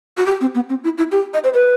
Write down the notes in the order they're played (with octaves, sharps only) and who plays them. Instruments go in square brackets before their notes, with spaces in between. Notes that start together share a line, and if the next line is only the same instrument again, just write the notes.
[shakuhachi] F#4
G4
C4
B3
C4
E4
E4
G4
D#5
C5
B4